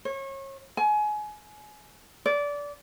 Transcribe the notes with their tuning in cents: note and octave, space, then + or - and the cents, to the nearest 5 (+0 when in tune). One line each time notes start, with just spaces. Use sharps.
C#5 -30
G#5 +25
D5 -20